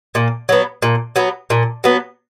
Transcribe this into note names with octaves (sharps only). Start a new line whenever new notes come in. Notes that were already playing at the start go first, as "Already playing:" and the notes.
A#2
F#3 B3
A#2
F#3 B3
A#2
F#3 B3